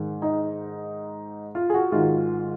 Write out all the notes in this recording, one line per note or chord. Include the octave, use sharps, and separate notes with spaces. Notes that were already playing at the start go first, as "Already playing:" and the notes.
Already playing: G#2 D#3
D#4
F4
G#4
F#4
G#2 D#3 F4